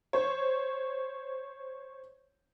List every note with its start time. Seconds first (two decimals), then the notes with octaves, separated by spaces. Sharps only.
0.13 C5 C#5